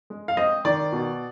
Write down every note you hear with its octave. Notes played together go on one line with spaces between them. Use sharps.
G#3
F5
C4 D#5
D#3 D5
B2